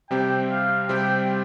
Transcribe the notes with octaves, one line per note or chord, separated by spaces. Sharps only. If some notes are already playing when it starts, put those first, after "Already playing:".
C3 G3 C4 G4 G5
F5
C3 G3 C4 G4 G5